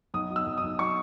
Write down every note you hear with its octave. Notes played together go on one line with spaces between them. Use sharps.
B1 D#6
F#3
E6
B1
D#6
B1
F#3 C#6